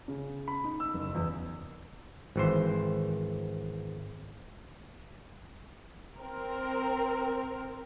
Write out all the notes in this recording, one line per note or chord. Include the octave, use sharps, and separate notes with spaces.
C#3
B5
D#4
E6
F#1
E2
G#1 E3 C5
C4 A#4